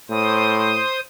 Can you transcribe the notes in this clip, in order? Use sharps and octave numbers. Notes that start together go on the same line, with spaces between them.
A2 C5 D#6